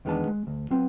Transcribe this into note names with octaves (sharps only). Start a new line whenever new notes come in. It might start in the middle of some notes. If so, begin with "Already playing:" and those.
E2 D#3 G#3 B3 D4 A5
G#3
D2
F#3 B3 C4